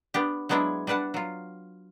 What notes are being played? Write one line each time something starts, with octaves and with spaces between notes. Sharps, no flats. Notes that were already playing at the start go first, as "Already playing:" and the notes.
B3 D4 G4
F#3 G#3 B3 D4 E4 G#4
G3 D4 B4 F#5 A5
F#3 F4